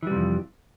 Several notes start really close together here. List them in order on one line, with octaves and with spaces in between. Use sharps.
E3 G3 C3 F2